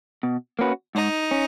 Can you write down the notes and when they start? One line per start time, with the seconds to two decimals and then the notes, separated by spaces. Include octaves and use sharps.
0.23 B2
0.59 A#3 C#4 F#4 B4
0.95 G#2 D#4
1.31 C#4